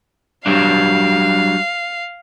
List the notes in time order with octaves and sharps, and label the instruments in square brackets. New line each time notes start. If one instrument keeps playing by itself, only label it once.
[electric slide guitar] F#3 G3 D4 [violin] F5